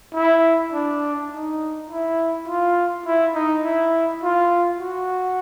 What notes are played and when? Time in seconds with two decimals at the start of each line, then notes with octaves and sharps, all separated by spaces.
0.14 E4
0.73 D4
1.32 D#4
1.90 E4
2.48 F4
3.06 E4
3.35 D#4
3.64 E4
4.23 F4
4.81 F#4